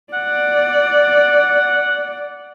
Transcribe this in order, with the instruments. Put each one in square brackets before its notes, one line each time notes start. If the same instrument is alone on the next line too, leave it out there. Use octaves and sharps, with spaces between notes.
[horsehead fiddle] D5 [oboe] F#5